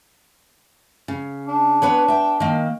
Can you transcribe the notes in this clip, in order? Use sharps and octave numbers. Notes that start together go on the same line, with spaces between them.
C#3
D4
B3 B4 C#5
E5 G5
D#3 A#3